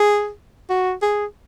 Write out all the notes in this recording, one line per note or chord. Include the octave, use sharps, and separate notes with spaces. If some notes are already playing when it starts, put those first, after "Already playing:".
Already playing: G#4
F#4
G#4